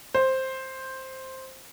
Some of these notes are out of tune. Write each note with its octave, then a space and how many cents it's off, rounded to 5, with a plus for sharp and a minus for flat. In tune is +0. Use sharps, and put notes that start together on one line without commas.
C5 +5